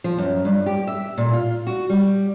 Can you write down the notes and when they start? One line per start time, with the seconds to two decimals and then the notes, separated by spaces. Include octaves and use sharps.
0.04 F3
0.18 F#2
0.45 G2
0.66 G4
0.87 E5
1.18 A#2
1.33 F4
1.67 F#4
1.90 G3